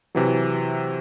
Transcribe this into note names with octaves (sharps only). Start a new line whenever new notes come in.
C3 E3 F#3